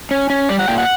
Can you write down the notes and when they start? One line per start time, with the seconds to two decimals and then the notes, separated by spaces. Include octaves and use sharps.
0.11 C#4
0.30 C#4
0.49 G3 D5
0.59 F#5
0.68 A#2 G5
0.78 F#5